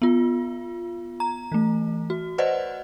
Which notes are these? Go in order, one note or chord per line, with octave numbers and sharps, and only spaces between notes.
B3 F4
A#5
E3 A3
F#4
B4 C5 D5 D#5 F#5